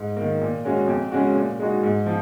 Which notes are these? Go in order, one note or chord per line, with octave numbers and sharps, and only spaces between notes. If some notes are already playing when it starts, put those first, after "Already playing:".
Already playing: G#2
D#3 A#3
A#2
G#3 C#4 F#4
F2
C#3 G#3 C#4 F#4
A#2
G#3 D#4 F#4
G#2
F3